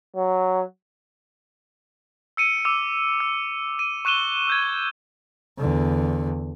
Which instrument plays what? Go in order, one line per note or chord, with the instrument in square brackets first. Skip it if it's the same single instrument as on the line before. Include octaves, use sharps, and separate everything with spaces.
[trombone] F#3
[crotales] E6 C#7 D#7
D6 E6 D#7
E6
D#7
C#6 F#6 D#7 E7 G7
E6 G6 G#6
[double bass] E2 D3